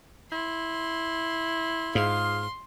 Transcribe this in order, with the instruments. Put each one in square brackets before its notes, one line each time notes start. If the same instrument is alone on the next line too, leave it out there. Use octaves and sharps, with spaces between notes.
[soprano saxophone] E4 [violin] C6
[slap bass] G#2 [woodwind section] F4 G#4 F5 [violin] C6